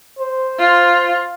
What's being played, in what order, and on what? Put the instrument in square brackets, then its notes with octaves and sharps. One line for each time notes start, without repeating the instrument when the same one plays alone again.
[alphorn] C5
[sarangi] F4